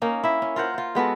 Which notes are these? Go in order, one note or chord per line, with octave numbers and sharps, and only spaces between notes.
A#3 C#4 D#4
E4 E5
C#4
F4 A#4 C5 F#5
F4 C5
G#3 B3 F#4 A4